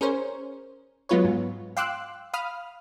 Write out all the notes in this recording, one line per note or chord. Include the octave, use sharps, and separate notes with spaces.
C#4 G#4 A#4 C5 C#5
F#3 G#3 B3 F4 B4 C#5
G#2
F5 G5 C6 D6 E6 F#6
F5 B5 D#6 F6